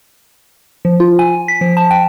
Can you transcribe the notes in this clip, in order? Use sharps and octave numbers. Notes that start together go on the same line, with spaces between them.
F3
F4
G#5
B6
F3
A5
G5